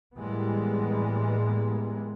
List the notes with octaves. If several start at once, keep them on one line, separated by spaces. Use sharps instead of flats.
A2 E3 G3 G#3 A#3 B3